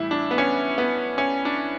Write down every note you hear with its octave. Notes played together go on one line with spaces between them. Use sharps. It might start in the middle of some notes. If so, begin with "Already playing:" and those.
Already playing: A2 E3 G3 E4
D4
B3
C#4
B3
C#4
D4